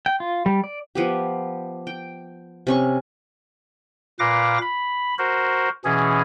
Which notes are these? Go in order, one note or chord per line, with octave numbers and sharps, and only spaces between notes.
G5
F4
G3
D5
F3 B3 G4
G5
C3 C#4 C#6
A#2 B4 F5 D6 A#6
B5
F#4 A#4 C5
B2 E3 C#4 G#4